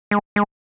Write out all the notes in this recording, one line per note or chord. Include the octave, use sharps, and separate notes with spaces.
G#3
G#3